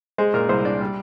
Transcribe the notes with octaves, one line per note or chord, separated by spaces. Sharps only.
G#3 C5
A#2 A#4
C2 C5
D4 D5
G3